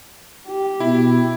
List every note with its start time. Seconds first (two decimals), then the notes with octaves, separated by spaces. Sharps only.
0.48 G4
0.80 B2 E4